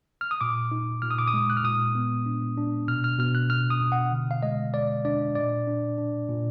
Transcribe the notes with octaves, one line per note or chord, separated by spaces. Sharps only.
F6
D#6
A#2 D6
D#4
A#2 F6
D#6
D6
D#6
G#3
F#6
F6
A#2 D#6
B3
D4
D4
B2 F6
F6
B2 F6
F#6
B2 F6
D#6
B2
F#5
D3
F5
G#3 D#5
G#3 D5
D4 D5
A#2 D5
D4
D4
A#2